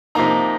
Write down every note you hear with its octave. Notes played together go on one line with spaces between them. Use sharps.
C3 F3 A#3 D#4 A#5